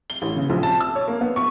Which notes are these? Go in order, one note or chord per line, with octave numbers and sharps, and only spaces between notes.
G7
A1
C#3
A#1
A5
E6
C#5
A#3
B3
C#6